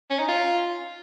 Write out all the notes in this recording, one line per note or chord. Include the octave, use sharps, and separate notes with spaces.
C#4
D#4
F4